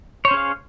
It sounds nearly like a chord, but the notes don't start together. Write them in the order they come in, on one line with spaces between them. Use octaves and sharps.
C#5 C5 C#4 G#4 F5